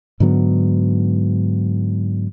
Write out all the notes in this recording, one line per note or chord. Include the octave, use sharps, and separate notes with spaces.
G#2 D3 F#3 B3